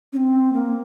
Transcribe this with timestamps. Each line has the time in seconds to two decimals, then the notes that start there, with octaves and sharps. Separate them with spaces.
0.13 C#4
0.17 C4
0.53 A#3